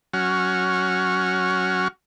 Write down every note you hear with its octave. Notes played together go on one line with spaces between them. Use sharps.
F#3 C#4 F#4 F6